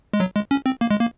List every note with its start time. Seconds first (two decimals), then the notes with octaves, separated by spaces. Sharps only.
0.13 G#3
0.20 F#3
0.35 G#3
0.51 C#4
0.66 C4
0.81 A#3
0.91 G#3
1.01 A#3